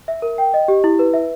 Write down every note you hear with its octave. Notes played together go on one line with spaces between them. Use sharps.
E5
A#4
G5
D#5
G4
E4
B4
E5